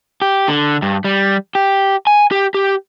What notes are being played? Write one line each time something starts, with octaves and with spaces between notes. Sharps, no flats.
G4
D3
G2
G3
G4
G#5
G4
G4